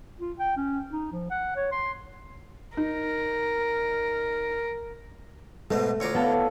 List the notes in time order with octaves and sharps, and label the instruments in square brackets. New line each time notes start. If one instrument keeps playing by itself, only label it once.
[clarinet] F4
G5
C#4
D#4
F3
F#5
C#5
C6
[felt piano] D#4 [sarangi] A#4
[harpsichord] G#2 B2 B3 [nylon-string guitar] A3
[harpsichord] D2 F4 A#5 [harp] C#5 D5
[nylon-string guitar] B3 [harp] E4 A4 F5